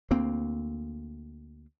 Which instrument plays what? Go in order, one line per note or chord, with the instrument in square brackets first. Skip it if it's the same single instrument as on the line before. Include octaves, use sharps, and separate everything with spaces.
[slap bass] D2 A#3 C4